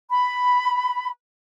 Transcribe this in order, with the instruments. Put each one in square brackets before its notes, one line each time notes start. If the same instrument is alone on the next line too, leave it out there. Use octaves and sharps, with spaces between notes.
[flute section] B5